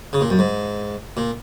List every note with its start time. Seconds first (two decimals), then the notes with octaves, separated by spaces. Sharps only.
0.13 C#3
0.21 A#2
0.30 F#2
0.39 G#2
1.17 A#2